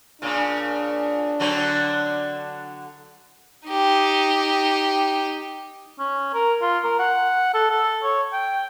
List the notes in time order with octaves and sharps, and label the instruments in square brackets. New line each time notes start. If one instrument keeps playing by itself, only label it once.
[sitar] A#2 C#3 [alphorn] D4
[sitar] D3 F#3 C4
[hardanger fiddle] D#4 G4
[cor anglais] C#4
A#4
F4
A#4
F#5
A4
A4
C#5
G5